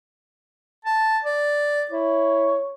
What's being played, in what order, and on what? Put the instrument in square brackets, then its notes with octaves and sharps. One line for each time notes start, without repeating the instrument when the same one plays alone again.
[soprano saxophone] A5
D5
[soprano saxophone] E4 [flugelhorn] C#5